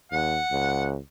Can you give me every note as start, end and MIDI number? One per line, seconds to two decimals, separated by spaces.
0.12 0.39 39
0.12 0.86 78
0.52 0.97 37